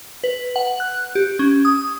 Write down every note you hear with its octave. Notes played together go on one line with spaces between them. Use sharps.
B4
F#5
F#6
G4
C#4
D#6